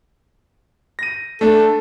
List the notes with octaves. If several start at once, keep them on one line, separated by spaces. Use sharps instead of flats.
A#6 D#7
A3 D4 A4